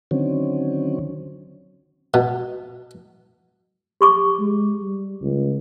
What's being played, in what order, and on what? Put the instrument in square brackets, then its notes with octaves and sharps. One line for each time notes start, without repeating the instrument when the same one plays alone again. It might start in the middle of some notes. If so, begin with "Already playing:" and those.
[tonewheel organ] D3 D#3 F#3 C4 C#4
[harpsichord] B2
[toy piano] G4 C#6 D6
[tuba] G#3
G3
C#2